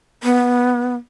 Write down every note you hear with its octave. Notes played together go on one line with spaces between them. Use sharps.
B3